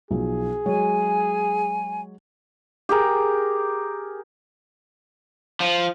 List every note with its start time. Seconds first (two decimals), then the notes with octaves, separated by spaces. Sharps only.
0.11 B1 F3 G#4
0.66 F#3 G#3 C#5 G#5
2.89 G4 G#4 A#4
5.60 F3